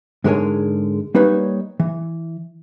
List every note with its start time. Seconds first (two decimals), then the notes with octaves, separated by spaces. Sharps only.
0.24 G#2 D3 G#3 A#4 C#5 G#5
1.15 G3 A#3 D#4 B4 C#5
1.80 E3